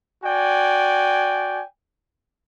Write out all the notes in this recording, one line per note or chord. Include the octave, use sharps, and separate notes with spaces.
F#4 D5 G5 G#5